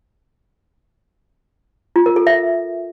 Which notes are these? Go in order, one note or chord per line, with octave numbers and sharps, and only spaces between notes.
F4
A#4
A4
E5